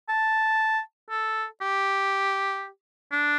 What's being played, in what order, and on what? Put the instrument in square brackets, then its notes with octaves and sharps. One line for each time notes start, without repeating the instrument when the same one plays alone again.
[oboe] A5
A4
G4
D4